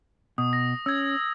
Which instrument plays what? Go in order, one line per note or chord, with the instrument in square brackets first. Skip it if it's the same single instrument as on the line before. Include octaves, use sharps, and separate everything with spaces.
[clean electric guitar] B2 [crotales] D#6
[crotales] A#6
[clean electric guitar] C#4 [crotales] E6 G#6